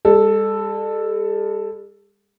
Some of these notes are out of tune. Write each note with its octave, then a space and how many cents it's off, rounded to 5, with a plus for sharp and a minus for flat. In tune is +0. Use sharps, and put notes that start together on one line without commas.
G3 +45 A4 +0